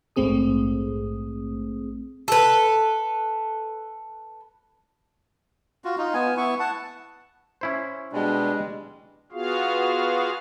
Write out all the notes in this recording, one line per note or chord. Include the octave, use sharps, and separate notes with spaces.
A#1 G#2 A3 C4 G#4 D#6
A4 B4
F4 F#4
D#4 F4
B3 G#5
B3 E4 C#6
F#5 A5
C#4 E4 C5
B2 G3 G#3 D4
B3 F4 F#4 G#4 F5